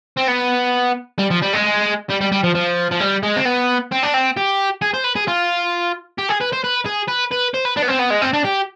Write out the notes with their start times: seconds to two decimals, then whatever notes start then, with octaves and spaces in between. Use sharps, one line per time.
0.17 C4
0.28 B3
1.18 G3
1.30 F3
1.42 G3
1.53 G#3
2.10 G3
2.21 G3
2.32 G3
2.44 F3
2.55 F3
2.92 F3
3.01 G3
3.23 G#3
3.36 C4
3.45 B3
3.92 C4
4.03 D4
4.14 C4
4.37 G4
4.82 G#4
4.94 C5
5.04 B4
5.16 G#4
5.28 F4
6.18 G4
6.29 G#4
6.41 B4
6.52 C5
6.64 B4
6.86 G#4
7.08 B4
7.32 B4
7.54 C5
7.65 B4
7.77 D4
7.82 B3
7.88 C4
7.99 B3
8.10 G#3
8.22 C4
8.33 D4
8.45 G4